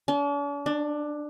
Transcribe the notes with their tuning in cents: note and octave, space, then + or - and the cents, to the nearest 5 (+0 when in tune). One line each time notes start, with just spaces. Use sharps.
D4 -45
D4 +15